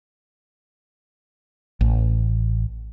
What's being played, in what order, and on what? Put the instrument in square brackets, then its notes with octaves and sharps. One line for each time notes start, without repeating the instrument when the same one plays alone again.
[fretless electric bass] A1